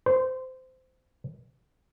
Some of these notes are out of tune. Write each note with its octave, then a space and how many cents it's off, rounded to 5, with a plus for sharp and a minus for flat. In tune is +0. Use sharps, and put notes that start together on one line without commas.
C5 -20